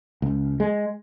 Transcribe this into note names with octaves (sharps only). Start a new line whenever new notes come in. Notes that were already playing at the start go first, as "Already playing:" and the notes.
C#2
G#3